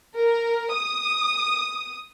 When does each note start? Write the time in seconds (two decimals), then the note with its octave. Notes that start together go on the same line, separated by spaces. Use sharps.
0.14 A#4
0.72 D#6